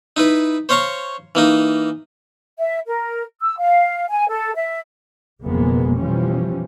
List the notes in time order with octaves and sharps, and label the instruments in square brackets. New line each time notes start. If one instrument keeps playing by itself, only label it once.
[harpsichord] D#4 E4 B4
C5 C#5 F5 A#5 C#6
E3 A#3 D#4
[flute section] E5
A#4
E6
F5
G#5
A4
E5
[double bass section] F#1 F2 B2 G#3 A#3 B3
B2 E3 F3 G3 C#4